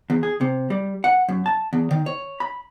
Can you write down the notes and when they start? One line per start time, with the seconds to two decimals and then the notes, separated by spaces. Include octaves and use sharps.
0.10 E2
0.23 G#4
0.41 C3
0.70 G3
1.04 F#5
1.29 F#2
1.46 A5
1.73 E2
1.91 D#3
2.06 C#5
2.40 B5